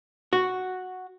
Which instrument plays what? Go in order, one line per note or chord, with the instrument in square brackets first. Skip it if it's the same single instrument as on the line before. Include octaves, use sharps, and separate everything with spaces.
[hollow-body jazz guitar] F#4